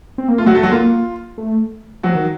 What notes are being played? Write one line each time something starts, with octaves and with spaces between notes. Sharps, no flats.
C4
A#3
A3 F4
F#3 F#4
A3 A4
F#3 F#4
A#3 F4
A3
F3 F#3 F#4
D#3